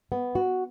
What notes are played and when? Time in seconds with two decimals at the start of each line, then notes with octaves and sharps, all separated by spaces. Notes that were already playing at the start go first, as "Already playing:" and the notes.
0.12 B3
0.35 F#4